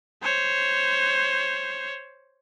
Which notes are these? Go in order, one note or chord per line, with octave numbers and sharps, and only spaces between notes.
C5 C#5